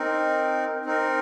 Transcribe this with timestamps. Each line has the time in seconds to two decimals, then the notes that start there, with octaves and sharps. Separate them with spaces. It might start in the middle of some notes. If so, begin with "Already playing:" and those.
Already playing: C4 D#4 A#4
0.85 C4 D#4 A#4